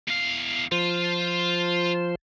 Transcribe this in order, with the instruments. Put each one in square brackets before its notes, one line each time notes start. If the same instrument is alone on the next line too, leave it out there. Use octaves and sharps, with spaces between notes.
[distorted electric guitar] E2 F5
[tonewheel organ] F3 C5 [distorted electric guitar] F4